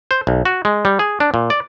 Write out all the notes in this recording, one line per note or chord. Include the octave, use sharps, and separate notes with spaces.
C5
B1
F#4
G#3
G3
G#4
D4
A#2
D5